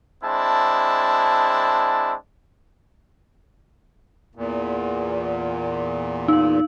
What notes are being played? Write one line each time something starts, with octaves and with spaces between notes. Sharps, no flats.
G#3 C4 D4 E4 A5
E2 A#2
D#4 F5